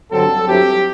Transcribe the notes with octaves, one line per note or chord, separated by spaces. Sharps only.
G2 D3 F#3 C4 A4
G2 F#3 C4 E4 G4